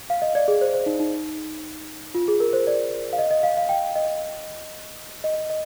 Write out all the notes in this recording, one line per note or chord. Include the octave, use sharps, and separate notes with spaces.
F5
D#5
D5
G#4
C5
C5
D#4
D#4
F4
G#4
A#4
C5
D5
F5
D#5
D#5
F5
F5
G5
D#5
D#5
D#5